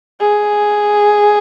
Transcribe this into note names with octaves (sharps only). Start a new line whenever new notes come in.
G#4